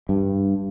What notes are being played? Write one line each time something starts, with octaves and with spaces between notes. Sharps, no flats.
G2